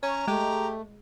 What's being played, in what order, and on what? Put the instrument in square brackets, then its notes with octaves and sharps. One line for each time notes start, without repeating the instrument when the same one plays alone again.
[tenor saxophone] C#4 [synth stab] C#5 [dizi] A#5
[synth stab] G#3 [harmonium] A3 [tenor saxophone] G4